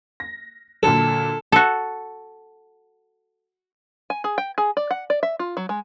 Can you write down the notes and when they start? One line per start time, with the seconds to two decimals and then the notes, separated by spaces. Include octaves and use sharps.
0.20 A#6
0.83 A#2 D3 F#3 A4
1.52 F#4 A4
4.10 G#5
4.24 G#4
4.38 G5
4.58 G#4
4.77 D5
4.91 F#5
5.10 D5
5.23 E5
5.39 F4
5.57 F#3
5.69 G#3